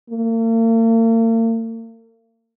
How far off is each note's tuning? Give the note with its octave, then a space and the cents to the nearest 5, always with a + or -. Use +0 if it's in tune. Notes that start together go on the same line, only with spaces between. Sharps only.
A#3 -45